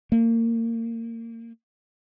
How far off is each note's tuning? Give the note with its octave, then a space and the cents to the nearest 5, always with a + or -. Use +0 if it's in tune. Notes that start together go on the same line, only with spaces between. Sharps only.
A#3 -25